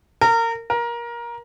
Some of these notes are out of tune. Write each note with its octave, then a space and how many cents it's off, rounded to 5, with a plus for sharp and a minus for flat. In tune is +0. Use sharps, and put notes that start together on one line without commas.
A#4 -25
A#4 +20